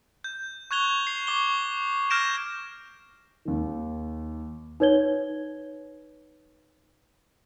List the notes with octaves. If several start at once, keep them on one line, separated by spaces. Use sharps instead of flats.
G6
C#6 F#6 G#6 F7 G7
C7
C#6 D6 G7
F6 G6 G#6 A#6 D7 E7
D#2 D#3
D#4 B4 C#5 G#6 G7